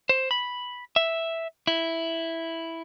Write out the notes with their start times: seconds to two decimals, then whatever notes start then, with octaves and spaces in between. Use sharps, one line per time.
0.09 C5
0.31 B5
0.96 E5
1.67 E4